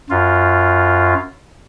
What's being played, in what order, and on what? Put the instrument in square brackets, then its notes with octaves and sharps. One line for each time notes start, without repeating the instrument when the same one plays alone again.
[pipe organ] F#2 F4